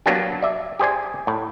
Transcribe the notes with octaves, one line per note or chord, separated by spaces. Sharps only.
F#3 A#3 B3 D4 G4
D5 E5
G4 G#4 C5 D5 G#5
A2